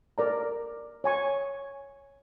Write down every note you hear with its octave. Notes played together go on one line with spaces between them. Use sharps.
A#4 D5 A#5
C#5 G#5 C#6